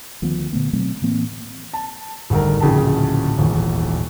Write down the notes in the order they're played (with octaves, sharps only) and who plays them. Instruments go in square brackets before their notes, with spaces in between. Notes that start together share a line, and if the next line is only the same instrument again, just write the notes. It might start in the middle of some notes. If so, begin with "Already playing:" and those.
[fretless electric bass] D2 D#3 F3 B3
A#2 D3 A3 B3
B2 F#3 A3 C4
A2 E3 A#3 C4
[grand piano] A5
G#1 D2 G3 A#4
D1 A#1 C#3 G5 A5
D#1 G#1 E2